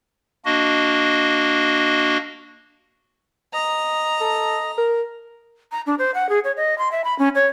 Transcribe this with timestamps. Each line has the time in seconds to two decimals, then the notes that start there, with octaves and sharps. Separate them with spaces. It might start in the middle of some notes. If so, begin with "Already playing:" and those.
0.45 A#3 D4 F#4 D#5
3.54 D#5 A#5
4.21 A4
4.78 A#4
5.72 A#5
5.86 D4
5.99 C5
6.14 F#5
6.29 G#4
6.44 C#5
6.57 D#5
6.78 C6
6.92 E5
7.04 B5
7.19 C#4
7.35 C#5